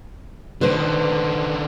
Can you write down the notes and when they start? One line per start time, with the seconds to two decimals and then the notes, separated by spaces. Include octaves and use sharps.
0.61 D3 D#3 B4 C5